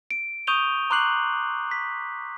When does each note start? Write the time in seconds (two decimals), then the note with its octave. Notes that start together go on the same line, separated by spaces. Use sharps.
0.11 D7
0.47 C#6 D#6 G6 D#7 F7 G7
0.90 A#5 C6 D6 F#6 C7 F#7
1.71 B6